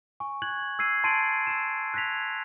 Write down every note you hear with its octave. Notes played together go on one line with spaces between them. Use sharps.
G#5 C#6
F#6 G#6 F#7
E6 G#6 C7 D#7
A5 C6 A6 C7 D7 D#7
E6 E7
F#6 G#6 A#6 B6 F7